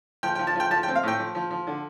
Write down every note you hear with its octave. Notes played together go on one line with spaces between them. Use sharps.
F3 G5
G5
F3
A5
F3 G5
F3 A5
G5
C4
F5
A2 G5
F3
F3
F3
D3